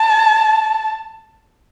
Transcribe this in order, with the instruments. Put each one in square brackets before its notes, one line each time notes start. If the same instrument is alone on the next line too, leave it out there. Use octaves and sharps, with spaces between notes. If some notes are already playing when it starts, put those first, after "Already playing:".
Already playing: [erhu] A5